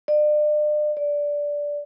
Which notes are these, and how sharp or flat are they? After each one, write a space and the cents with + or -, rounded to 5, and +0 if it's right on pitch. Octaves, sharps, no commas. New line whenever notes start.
D5 +40
D5 -10